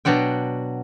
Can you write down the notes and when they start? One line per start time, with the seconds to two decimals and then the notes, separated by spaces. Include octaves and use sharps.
0.05 B2 F#3 D4 F#4 G5